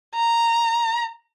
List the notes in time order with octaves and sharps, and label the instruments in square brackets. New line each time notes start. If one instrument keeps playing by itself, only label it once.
[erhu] A#5